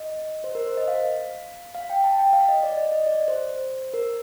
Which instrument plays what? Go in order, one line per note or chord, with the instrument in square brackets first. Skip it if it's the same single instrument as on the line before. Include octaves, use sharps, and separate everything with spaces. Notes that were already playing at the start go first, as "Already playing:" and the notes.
Already playing: [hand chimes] D#5
C5
A#4
C5
D#5
F5
F5
G5
A5
G5
F5
D#5
D5
D#5
D#5
D5
C5
A#4